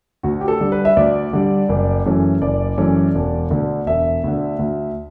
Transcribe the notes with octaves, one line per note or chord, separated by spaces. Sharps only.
D2 F#4
G4
A4
D3 G3
B4
E5
D2 D5
D3 G3
F#1
F#2 E3 A3 C#4
F#1 D5
F#2 E3 A3 C#4
E1
D2 D3
E1 E5
D2 D3
D2